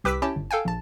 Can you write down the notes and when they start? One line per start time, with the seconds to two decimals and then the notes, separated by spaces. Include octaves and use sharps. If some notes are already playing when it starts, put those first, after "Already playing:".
0.04 C2 G4 B4 D6 E6 B6
0.22 C#4 E4 G4 G5 A5
0.36 G1
0.51 A4 F5 G5 G#5
0.65 A#1 A5